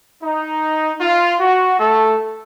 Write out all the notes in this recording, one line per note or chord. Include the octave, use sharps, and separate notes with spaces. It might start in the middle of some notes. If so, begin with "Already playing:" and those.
D#4
F4
F#4
A3 A4